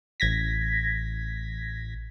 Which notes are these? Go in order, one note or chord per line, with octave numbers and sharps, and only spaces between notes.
A1 G#6 A#6 B6